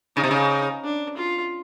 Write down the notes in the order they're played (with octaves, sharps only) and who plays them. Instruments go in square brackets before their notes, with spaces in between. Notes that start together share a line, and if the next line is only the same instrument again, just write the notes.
[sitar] C#3 [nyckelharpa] D#4
[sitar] C3
C#3
[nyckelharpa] D4
F4